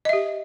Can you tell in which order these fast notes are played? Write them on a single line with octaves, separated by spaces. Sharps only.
D#5 E5 G4